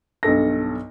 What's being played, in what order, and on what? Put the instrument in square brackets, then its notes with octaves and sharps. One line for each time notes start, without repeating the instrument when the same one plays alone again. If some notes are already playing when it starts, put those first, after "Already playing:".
[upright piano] B1 G2 A4 A#6